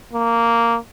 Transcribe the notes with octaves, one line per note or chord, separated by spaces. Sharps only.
A#3